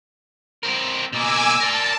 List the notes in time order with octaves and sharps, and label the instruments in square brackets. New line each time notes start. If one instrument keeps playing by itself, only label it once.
[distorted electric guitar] C4 A#4
[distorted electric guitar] B2 A#3 [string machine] G#5 D6 E6
[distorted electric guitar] A#4 D5 [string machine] A5